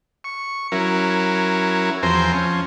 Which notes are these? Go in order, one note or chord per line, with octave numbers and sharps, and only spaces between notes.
C#6
F#3 C#4 E4 A#4
E2 F3 C4 C5 G#5 A#5
F3 C#4